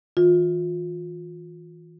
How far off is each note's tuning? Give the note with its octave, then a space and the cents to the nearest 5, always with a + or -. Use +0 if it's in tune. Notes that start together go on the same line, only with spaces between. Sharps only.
E3 -30 F4 +30